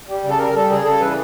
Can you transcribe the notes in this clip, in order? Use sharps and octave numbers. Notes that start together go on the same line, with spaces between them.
G3
C#3
A4
G3 A#4
G3 A4
C#3 G#4
C#3 A4
E3 B4